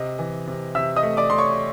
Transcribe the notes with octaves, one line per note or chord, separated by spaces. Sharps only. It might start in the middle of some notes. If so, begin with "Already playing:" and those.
Already playing: C3 D#5
E3
C3
C3 E5 E6
D#5 D#6
A3
D5 D6
A3 C6
C#5 C#6